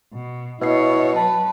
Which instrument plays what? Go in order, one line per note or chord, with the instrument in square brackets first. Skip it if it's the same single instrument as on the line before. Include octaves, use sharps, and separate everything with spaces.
[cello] B2
[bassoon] B2 [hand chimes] B3 D#5 C7 [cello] E4 C#5
[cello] F#3 B4 [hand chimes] A5